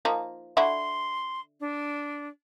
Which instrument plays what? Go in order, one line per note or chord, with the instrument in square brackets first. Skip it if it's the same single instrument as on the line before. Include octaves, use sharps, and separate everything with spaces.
[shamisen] F3 A#3 D#4
[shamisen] D3 E4 F#4 [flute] C6
[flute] D4